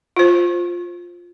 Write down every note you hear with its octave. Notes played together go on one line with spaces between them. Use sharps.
F4 C5